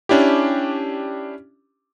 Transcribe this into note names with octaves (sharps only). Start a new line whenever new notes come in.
C#4 D4 E4 G4